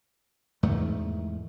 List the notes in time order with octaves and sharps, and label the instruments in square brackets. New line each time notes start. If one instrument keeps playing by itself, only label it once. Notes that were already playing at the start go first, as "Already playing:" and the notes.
[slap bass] E2 G#2 D#3 A3